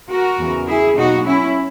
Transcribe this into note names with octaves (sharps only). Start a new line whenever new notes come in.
F#4 A#4
E2 C#3 E3
E4 G#4
B2 F#3 A#3 D#4 F#4
C#4 E4